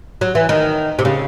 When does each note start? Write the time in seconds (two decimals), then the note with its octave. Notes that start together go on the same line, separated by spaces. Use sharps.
0.21 F#3
0.35 E3
0.49 D#3
0.99 C3
1.05 C#3